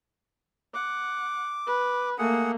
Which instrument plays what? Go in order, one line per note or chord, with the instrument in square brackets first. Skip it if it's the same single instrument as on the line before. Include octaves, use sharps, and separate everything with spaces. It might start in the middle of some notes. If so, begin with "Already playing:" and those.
[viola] F#5 [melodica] D6
[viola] B4
[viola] A3 A#3 [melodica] G#4 F#5